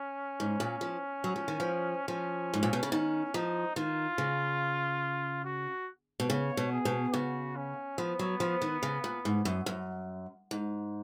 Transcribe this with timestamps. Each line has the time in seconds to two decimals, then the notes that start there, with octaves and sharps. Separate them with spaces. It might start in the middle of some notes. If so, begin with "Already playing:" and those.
Already playing: C#4
0.40 G#2
0.60 A#2
0.81 F3
1.24 F#3
1.36 F3
1.48 D#3
1.60 F3
2.08 F3 C#4
2.54 G#2
2.63 A#2
2.73 B2
2.83 C#3
2.92 D#3 C#4
3.34 F3 D#4
3.76 D#3 F4
4.18 C#3
5.45 F#4
6.20 B2
6.29 C#3 C#5
6.57 B2
6.72 G#4
6.85 B2
7.14 C#3 F#4
7.56 C#4
7.98 F3 B3
8.19 F#3
8.40 F3
8.62 D#3
8.83 C#3
9.04 A#2
9.25 G#2
9.45 F#2
9.66 F#2
10.51 G#2